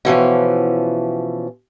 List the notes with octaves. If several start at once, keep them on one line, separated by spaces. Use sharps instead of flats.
B2 E3 F3 C#4